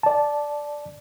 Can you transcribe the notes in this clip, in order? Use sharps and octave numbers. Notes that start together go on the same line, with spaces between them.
D5 A5